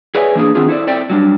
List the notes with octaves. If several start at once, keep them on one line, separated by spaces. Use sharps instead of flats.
G#4 B4 C#5 D5 E5 G#5
E3 A#3 D4 G#4
D#3 B3 C4 D4 F4 G#4
E4 A4 C5 D5
C4 A4 C5 D5 E5 G5
F#3 G3 D4